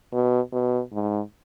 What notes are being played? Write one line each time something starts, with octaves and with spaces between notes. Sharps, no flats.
B2
B2
G#2